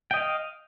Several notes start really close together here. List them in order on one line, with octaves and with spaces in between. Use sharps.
G5 D#5 F5